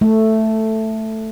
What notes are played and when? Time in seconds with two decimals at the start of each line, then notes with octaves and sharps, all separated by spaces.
0.01 A3